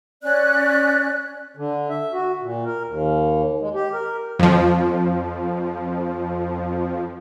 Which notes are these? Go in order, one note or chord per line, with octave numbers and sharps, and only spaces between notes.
C#4 D5 F#6
D3
E5
F#4
A#2
A#4
D#2
G#3
G4
A#4
F2 F3